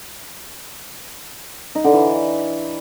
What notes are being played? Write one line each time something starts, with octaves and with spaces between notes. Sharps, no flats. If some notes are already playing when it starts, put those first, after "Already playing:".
D#4
D3
E3